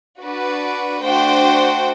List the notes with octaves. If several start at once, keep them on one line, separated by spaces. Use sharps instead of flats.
D4 F#4 B4 D5
A3 D4 F#4 C5 G5